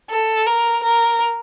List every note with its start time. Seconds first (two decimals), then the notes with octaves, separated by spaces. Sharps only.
0.11 A4
0.47 A#4
0.83 A#4